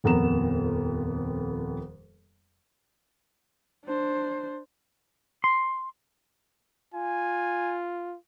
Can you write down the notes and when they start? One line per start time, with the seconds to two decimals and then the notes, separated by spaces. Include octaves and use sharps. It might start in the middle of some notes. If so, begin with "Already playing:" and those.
0.04 D#1 F2 B3 A#4 A#5 E7
3.85 D4 C5
5.44 C6
6.94 F4 G#5